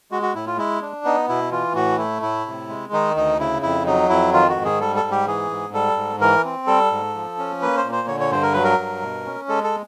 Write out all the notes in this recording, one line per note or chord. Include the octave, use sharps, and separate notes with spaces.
G#3 F#4
F#4
A2 E4
F4
G#3 E4
D4
B3 D#4
B2 E4
E3 F4
A2 F#4
A3 E4
A2 E4
C3
G#3
D#3 D#4
D2 D#4
C#3 E4
F2 E4
F#3 D#4
F2 E4
D#3 F4
F#4
G#2
G#4
G3 A4
A4
G#2
G4
E3 G#4
G#2
G3 A4
G#2
E3 A#4
C4
G3 A4
G#2
F3
C#4
A#3 B4
C5
A#2
C5
D3 C#5
C#5
G2 C5
A#4
F#3 B4
A#4
G2
B2
C#4
G#3 A4
A4